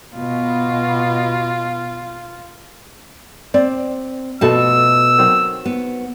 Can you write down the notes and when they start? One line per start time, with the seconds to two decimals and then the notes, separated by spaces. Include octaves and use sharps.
0.16 B2 F4
3.54 C4 D5
4.41 B2 F3 A3 F#4 A4 A5 E6
5.18 D#3 F#3 C4
5.66 B3